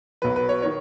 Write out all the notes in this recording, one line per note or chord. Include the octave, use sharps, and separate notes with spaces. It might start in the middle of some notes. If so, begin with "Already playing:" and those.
B1 B2 F#3 B4
B4
C#5
D#3 C#5